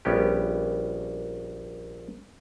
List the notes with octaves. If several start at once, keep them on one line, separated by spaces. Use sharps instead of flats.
A#1 G3 B3 C#4 G4